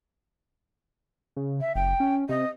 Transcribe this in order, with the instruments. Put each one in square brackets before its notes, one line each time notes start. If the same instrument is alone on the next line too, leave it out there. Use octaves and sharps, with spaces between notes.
[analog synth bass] C#3
[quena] E5
[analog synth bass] F#1 [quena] G5
[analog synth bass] C#4
[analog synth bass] C3 [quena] D#5